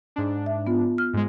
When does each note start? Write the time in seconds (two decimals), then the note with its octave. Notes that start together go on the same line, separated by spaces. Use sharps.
0.16 G#2 D4
0.46 E5
0.67 B3 F4
0.98 F6
1.13 G#2 G#3